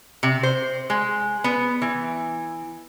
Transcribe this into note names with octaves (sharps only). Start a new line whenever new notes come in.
C3
C5
G#3
B3
E3